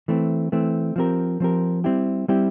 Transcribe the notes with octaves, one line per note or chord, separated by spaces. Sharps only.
E3 A3 C4
E3 A3 C4
F3 C4 G4 A#4
F3 C4 G4 A#4
G3 C4 E4 G4
G3 C4 E4 G4